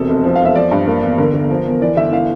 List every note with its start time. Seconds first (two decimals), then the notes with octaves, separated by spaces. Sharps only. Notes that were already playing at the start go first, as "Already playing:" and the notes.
Already playing: E1 C3 A4
0.09 F1
0.24 F3
0.35 E2 F5
0.45 E5
0.55 F3 D5
0.71 G2
0.87 A#3
1.03 E2
1.18 D3 A#4
1.34 G1
1.50 F3
1.66 E2
1.81 E3 D5
1.97 G1 E5
2.12 E3 F5